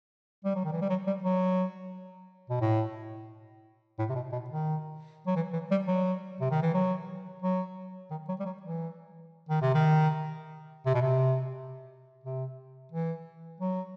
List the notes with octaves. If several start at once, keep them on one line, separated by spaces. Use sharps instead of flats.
G3
F#3
D#3
E3
G3
F#3
G3
F#3
B2
A2
A2
C3
B2
B2
D#3
F#3
E3
E3
G3
F#3
C3
D#3
E3
F#3
F#3
D#3
F#3
G3
F#3
E3
D#3
C3
D#3
C3
B2
C3
C3
E3
F#3